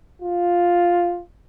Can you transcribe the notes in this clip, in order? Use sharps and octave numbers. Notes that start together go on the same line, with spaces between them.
F4